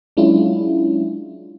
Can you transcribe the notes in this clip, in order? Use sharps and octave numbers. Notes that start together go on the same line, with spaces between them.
F#3 G#3 C#4 D4 E4 F4